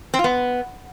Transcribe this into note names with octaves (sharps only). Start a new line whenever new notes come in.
C4
F4
B3